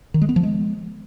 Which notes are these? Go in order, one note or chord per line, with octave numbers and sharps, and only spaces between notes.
D#3
G#3
B3
F3
G#3